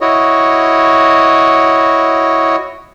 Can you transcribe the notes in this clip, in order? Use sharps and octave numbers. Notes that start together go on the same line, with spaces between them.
E4 F#4 C#5 D#5